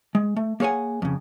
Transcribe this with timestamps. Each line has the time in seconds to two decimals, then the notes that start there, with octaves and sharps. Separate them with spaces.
0.15 G#3
0.36 A3
0.60 A#3 G#4 C#5 F#5 G#5
1.02 F2 C#3